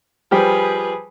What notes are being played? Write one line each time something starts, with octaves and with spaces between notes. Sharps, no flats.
F3 G3 G4 G#4 B4